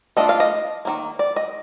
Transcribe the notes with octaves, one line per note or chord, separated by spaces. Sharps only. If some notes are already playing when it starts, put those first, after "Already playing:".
A3 D4 F4 D#5
F5
D#5
D#3 G3 A#3
D5
D#5